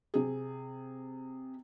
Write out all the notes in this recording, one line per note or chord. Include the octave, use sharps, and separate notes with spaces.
C3 G#4